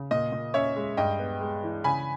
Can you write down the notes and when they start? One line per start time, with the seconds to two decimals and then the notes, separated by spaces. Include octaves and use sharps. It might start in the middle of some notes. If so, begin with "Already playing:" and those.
Already playing: C#3
0.11 A#2 D#5
0.32 A#2
0.54 C#4 C#5 E5
0.76 G#3
0.97 G2 D#5 G5
1.19 B3
1.41 G#3
1.63 E3
1.84 C#3 G#5 B5